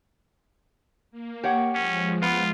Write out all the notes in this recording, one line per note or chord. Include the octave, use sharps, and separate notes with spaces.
A#3
G4 C#5 F#5
F3 G#3 C#4
B3 F4